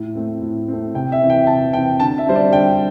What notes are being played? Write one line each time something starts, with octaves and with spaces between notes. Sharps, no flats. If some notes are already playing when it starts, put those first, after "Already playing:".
Already playing: A2
A3 C4
A2
A3 C4
C3 G5
E5
E3 C4
G5
C3 A5
E3 C4 G5
D3 A5
E5
G3 C4 C5
D5
D3 G5